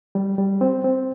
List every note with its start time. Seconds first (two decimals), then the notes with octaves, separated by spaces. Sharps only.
0.15 G3
0.38 G3
0.61 C4
0.84 C4